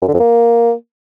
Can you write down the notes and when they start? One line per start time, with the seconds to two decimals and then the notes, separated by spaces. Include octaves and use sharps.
0.02 F#2
0.08 D3
0.14 F2
0.20 A#3